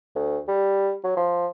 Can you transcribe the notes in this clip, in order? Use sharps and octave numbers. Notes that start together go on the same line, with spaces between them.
D2
G3
F#3
F3